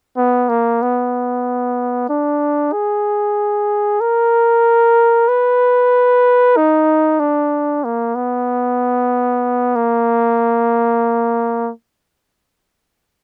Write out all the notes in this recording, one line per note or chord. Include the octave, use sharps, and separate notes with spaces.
B3
A#3
B3
D4
G#4
A#4
B4
D#4
D4
A#3
B3
A#3